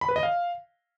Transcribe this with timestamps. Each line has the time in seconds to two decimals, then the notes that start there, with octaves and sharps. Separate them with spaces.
0.01 B5
0.09 B4
0.16 D#5
0.23 F5